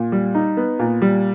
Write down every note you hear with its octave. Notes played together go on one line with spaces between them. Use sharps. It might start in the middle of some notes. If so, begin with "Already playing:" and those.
Already playing: A#2
G3
D#4
B3
A#2
G3